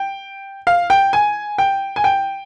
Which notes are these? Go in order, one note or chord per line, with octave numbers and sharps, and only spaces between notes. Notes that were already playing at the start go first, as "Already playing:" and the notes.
Already playing: G5
F5
G5
G#5
G5
G#5
G5